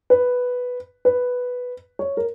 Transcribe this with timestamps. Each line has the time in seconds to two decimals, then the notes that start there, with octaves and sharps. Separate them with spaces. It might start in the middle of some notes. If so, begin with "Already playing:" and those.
0.10 B4
1.05 B4
1.99 C#5
2.17 A#4